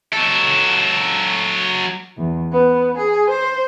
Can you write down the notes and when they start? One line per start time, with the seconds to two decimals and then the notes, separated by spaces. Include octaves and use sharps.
0.13 F#3 A4
2.17 E2
2.51 B3
2.97 G#4
3.29 C5